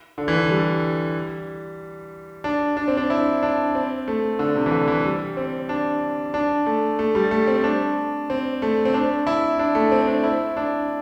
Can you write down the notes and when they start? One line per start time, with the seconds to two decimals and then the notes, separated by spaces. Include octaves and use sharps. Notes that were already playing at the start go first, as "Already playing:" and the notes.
0.18 D3
0.28 E3
0.37 D3
0.50 G3
2.44 D4
2.77 D4
2.88 C4
2.97 D4
3.10 E4
3.43 D4
3.75 C4
4.08 A3
4.39 D3
4.56 C3
4.66 E3
4.72 D3
4.88 E3
5.05 G3
5.37 C4
5.69 D4
6.34 D4
6.66 A3
6.99 A3
7.15 G3
7.31 A3
7.47 C4
7.64 D4
8.30 C4
8.62 A3
8.85 C4
8.94 D4
9.27 E4
9.59 D4
9.75 A3
9.92 C4
10.07 D4
10.23 E4
10.57 D4